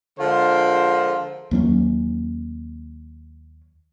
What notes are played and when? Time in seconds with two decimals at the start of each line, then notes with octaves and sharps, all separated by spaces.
0.18 D3 F3 G#3 F4 A#4 C5
1.51 D#2 F#3 C#4